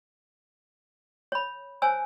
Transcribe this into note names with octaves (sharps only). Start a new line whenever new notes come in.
C#5 B5
C5 C#5 G#5 A5 E6